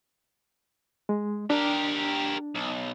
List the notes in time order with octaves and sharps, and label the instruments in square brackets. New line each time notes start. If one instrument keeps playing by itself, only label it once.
[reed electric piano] G#3
[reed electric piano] D4 [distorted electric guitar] G4 A#4
[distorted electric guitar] B1